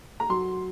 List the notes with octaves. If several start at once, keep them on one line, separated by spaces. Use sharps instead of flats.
A#5
F#3 C6